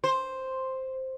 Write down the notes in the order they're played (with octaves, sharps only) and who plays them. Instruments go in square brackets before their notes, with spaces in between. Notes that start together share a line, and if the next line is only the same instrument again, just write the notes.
[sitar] C5